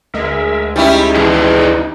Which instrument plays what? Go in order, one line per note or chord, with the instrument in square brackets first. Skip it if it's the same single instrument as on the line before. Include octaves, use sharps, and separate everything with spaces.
[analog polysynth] D2 G#3 [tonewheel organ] A#4 E5
[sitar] G3 C#4 E4 [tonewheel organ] D#4
[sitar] E2 [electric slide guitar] D4 E4 G#4